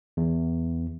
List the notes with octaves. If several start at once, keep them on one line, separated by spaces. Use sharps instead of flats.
E2